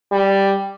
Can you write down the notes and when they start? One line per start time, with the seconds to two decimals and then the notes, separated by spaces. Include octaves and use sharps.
0.12 G3